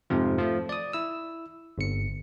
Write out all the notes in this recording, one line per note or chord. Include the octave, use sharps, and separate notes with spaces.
F2 G#2 C3 F3
F3 A3
D5 D#6
E4 E6
G1 C#7